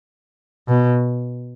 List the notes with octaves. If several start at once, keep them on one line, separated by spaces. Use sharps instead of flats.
B2